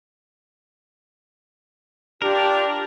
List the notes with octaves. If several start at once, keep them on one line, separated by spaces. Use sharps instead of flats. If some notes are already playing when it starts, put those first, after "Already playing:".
D4 F4 G4 A#4